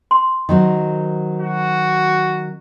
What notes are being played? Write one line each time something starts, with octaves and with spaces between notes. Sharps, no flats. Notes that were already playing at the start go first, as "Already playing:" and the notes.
C6
D#3 F#3 C4
F#4